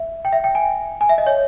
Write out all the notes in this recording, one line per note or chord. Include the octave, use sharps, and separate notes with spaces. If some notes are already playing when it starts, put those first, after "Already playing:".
Already playing: E5
G5
E5
G5
G#5
G#5
E5
D#5
C#5